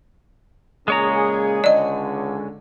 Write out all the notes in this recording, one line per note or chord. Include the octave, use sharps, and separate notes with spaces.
A#2 C#3 G#3 G#4 C#5 A#5
C#2 D3 D5 D#5